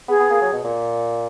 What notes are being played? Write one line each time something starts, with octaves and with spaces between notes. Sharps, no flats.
B3 G#4
B3
A#3
F#3
B2
A#2